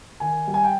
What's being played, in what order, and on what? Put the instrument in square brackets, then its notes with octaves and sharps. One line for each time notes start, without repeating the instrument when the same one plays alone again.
[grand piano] D#3 G#5
G3
G#5
G5